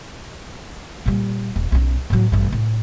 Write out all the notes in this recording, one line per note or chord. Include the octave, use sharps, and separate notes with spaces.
A#2 G3
D#1
B1 C#4
A2 F#3
A1 G2
A2